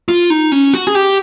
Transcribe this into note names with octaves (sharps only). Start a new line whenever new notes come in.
F4
D#4
C#4
F#4
G#4
G4